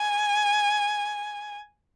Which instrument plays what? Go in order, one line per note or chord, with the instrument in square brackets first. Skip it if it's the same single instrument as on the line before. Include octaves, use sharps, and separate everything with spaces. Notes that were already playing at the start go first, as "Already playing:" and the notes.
Already playing: [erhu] G#5